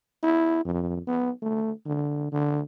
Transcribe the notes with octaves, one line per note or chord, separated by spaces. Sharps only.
E4
F2
B3
A3
D3
D3